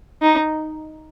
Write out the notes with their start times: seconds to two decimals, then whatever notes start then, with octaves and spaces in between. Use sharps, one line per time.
0.22 D#4